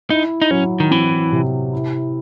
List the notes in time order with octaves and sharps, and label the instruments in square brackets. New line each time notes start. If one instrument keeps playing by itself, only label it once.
[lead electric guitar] D#4 [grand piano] E4
[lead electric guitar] D#4
[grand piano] F#3 [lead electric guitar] C#4
[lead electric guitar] D#3
[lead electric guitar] E3 [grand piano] C4
[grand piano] C3
E4